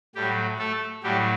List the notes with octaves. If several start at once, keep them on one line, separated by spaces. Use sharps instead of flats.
A2 F#3 G3 G4
A3 A4
A2 F#3 G3 G4